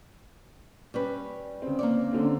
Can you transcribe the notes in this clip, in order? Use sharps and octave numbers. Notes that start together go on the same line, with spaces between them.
G3 C#4 B4
C#3 C4
A#3 C#5 D5
D3 C4 C#4